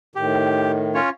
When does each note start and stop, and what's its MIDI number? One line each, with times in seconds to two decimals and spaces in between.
0.16 0.99 45
0.16 0.99 51
0.16 0.72 67
0.94 1.10 61
0.94 1.10 65
0.94 1.10 73